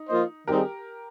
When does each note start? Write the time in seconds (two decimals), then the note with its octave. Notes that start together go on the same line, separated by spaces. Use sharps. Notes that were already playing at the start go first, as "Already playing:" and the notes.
Already playing: D#4
0.09 F3 A#3 F4 C5 D#5
0.47 D#3 G3 C4 D#4 G4 G#4 A#4